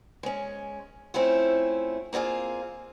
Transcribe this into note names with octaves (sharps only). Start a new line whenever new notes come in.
G#3 C#4
A3 C4 C#4 E4 F4
A#3 C4 F4 G#4 F5